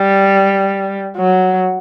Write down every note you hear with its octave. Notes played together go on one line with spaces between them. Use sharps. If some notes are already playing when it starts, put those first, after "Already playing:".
Already playing: G3
F#3